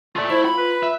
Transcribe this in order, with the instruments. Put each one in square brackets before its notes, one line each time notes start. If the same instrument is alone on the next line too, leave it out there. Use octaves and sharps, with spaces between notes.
[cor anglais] A3 [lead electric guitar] F4 D5
[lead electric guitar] E4 [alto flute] C5
[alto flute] F4 [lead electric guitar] B5
[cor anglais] B4
[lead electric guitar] E5